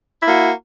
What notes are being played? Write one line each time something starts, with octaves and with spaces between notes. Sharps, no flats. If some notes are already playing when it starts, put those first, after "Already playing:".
A#3 E4 F#4